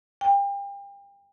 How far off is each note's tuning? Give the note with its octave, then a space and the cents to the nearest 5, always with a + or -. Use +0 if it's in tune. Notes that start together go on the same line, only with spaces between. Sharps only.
G5 +35